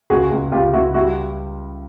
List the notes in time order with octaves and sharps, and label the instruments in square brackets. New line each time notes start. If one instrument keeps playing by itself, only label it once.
[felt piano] C#2 [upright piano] F#4 G#4
[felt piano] C#2
[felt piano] C#2 [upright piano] F4 G4
[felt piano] C#2 [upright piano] E4 F#4
[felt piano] G3 [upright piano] E4 F#4